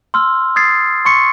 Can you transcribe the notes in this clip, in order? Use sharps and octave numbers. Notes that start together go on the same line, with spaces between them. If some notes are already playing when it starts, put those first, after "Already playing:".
C6 E6 F6
D#6 G#6 A6 C7
C6 C#6 C#7